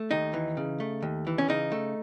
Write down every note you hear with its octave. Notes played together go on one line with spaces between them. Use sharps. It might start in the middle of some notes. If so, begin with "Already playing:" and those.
Already playing: A3
D#2 D#4
E3
C#3
A3
D#2
E3
C#4
C#3 D#4
A3